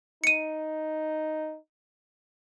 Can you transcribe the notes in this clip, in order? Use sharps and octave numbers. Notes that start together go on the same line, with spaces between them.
D#4 C#7 D#7